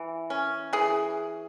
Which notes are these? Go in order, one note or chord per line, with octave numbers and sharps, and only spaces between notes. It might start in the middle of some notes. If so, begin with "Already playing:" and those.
Already playing: E3
C#4
E3 G#4